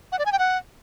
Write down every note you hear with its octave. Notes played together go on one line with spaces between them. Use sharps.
F#5
D5
G#5
G5
F#5